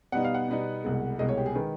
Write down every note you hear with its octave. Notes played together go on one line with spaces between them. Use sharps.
B2 G3 B3 D#4 F#5
F5
F#5
B2 G3 B3 D#4
C2 B2 G#3
C2 B2 G#3 D#5
C#5
G4
G#4
D#3 G#3 B4